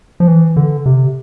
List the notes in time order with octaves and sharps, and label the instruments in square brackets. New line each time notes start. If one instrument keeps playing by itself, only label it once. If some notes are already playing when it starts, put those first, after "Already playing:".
[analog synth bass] F3
E3
D3
C3